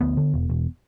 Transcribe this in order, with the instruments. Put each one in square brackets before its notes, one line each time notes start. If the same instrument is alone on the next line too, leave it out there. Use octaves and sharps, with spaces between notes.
[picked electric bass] D2 B3
D3
E1
E1